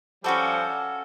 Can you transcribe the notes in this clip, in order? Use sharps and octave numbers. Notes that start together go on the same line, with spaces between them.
F3 G3 C#4 F#4 A4